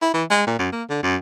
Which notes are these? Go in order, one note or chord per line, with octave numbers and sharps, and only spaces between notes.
E4
E3
G#3
A#2
F#2
A#3
D3
F#2